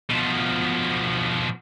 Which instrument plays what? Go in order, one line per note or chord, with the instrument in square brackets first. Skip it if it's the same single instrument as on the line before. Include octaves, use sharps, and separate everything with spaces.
[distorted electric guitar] B2 F3